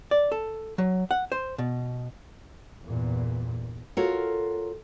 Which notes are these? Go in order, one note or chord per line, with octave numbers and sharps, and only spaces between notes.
D5
A4
F#3
F#5
C5
B2
E2 G2 A#2
F4 F#4 A4 A#4 C#5